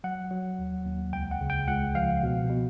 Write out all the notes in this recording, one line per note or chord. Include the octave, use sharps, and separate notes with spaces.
F#3 F#5
F#3
D#2
D#2
C#2 G5
F#5
C#3
G5
C#2 F#5
F3 F5
B2
B2